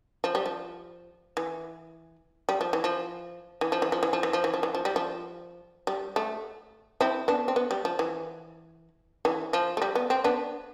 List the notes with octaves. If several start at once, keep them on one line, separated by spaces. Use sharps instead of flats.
F3
G3
F3
E3
G3
F3
E3
F3
E3
F3
E3
F3
E3
F3
E3
F3
E3
F3
E3
F3
G3
F3
G3
A3
C4 E4
B3 D4
C4
B3
G3
F3
E3
E3
F3
A3
G3
B3
C4
B3 D4